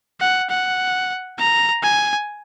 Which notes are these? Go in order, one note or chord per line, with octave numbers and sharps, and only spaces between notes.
F#5
F#5
A#5
G#5